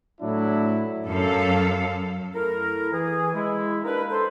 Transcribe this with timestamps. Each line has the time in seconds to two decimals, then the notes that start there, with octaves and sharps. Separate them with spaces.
0.21 A2 F#3 D4 E4
1.07 F#2 A4 F5
2.35 A3 E4 A#4
2.93 E3 G#4
3.34 G#3 E4
3.84 G3 A#3 D4 D#4 A#4 B4
4.11 A4 C5